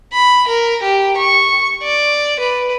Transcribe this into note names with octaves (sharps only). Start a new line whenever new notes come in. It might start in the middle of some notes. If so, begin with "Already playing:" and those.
B5
A#4
G4
C#6
D5
B4